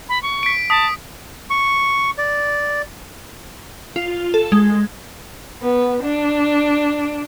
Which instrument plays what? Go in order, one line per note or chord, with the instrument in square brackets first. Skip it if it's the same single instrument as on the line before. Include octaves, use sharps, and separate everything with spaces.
[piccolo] B5
C#6
[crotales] B6 D7
[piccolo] A5 [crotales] D#6 B6
[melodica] C#6
D5
[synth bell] F4
A4
G#3
[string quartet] B3
D4